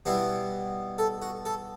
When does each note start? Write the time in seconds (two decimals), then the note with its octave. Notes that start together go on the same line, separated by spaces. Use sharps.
0.06 B2 G3 B3 E4 F#4
0.98 A4
1.22 F#4
1.45 A4